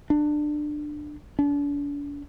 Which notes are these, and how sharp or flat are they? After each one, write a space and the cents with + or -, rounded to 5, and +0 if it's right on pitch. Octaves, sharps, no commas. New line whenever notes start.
D4 +20
D4 -40